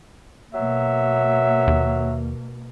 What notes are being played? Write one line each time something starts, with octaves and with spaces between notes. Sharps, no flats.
B2 F#3 A#3 E5
D#2